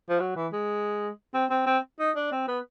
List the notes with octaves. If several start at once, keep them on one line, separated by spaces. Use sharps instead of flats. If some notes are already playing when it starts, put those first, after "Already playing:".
F3
F#3
E3
G#3
C4
C4
C4
D#4
D4
C4
B3